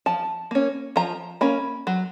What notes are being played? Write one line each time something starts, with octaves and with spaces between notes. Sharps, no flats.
F3 A5
A#3 C#4
F3 A#5
A#3 C#4 B5
F#3